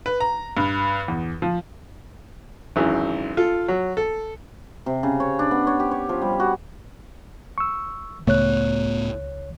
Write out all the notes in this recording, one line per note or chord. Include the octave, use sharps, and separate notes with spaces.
B4
A#5
G2
E2
F3
G#1 F#2 E3
F4 A4
F#3
A4
C3
C#3
C#5
D4
B3
C#5
G4
C#5
F3
G3
F#4
C#6 E6
C#2 A2 A3 B3 C#5 F#6